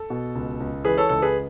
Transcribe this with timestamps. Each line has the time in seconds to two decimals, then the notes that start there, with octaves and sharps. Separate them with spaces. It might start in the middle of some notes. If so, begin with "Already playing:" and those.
Already playing: A4
0.10 B2
0.35 C#2
0.60 C#2
0.85 E3 G#4 B4
0.97 A4 C#5
1.09 C#2 A4
1.22 G#4 B4